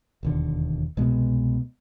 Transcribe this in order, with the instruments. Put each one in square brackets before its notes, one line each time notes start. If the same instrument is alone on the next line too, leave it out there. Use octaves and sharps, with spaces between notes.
[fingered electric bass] E1 D#2 D3
C2 B2 G#3 B3